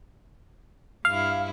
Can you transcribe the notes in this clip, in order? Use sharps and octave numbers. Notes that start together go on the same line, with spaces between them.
G2 E4 F5